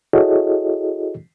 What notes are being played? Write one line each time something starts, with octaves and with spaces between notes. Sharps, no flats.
E4 F#4 G#4 A4 C#5 D#5